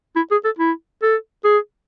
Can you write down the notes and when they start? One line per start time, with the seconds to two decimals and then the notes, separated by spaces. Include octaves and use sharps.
0.16 E4
0.31 G#4
0.45 A4
0.59 E4
1.03 A4
1.44 G#4